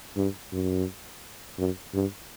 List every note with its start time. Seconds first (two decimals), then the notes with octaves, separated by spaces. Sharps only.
0.16 G2
0.52 F#2
1.58 F#2
1.94 G2